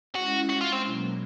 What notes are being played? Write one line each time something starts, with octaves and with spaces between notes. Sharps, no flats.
G#3 C#4 E4 F#4
F#4
F4
C4
B2 F#3 A#3